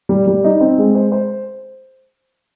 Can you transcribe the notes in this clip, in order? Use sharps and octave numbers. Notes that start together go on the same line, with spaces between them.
G3
G3
D#4
C4
G#3
C5
C5